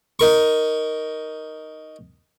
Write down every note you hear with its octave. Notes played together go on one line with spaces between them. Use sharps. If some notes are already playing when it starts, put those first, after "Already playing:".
D#4 A#4 C#6